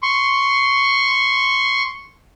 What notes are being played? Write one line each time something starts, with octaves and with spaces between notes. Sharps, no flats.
C6 C#6